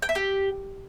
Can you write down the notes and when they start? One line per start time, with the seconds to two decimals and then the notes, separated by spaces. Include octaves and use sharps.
0.02 G5
0.09 E5
0.15 G4